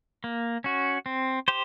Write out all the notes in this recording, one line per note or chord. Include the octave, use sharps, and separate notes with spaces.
A#3
C#4 F#4
C4
G4 C5